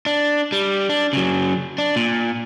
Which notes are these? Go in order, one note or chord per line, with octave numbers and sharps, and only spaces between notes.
D4
G3
D4
C#3 F#3
D4
A#2